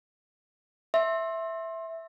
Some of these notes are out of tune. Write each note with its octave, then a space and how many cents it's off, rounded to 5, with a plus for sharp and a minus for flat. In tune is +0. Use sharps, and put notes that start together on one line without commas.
E5 +0 C6 +30